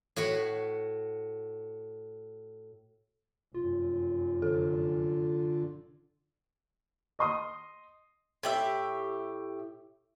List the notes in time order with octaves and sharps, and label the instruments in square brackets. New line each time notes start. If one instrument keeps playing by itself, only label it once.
[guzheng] A2 F#4 F#5 B5
[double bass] F1 F#2 [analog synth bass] F4
[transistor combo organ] D3 [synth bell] A4
[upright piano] D#5 C6 D#6
[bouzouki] A2 G4 E5